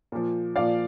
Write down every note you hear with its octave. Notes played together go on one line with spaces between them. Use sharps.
A#2 F3
A#2 F3 D5 F5